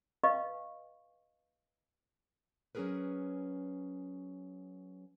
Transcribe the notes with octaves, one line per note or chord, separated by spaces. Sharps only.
B4 D#5 F5 C#6
F#3 C#4 D4 G#4 A#4 B4